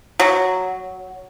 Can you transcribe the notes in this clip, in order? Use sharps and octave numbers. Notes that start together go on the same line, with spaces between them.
F#3